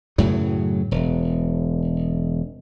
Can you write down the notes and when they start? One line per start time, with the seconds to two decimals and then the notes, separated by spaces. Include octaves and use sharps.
0.18 F#2 A2 C#3 F#3
0.91 E1